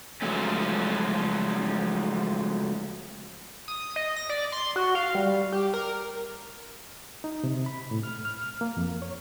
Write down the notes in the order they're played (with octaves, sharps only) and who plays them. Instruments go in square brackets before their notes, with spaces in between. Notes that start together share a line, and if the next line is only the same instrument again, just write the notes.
[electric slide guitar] C#3 F3 F#3 G#3 A3 C#4
[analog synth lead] D#6
D#5
A#6
D5
C6
F#4
F5
G3
G4
A#4
[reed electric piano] D#4
C3
B5
A2
F6
F6
A#3
F2
C#5